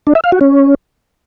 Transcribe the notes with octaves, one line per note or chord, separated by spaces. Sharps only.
D4
E5
F5
F#4
C#4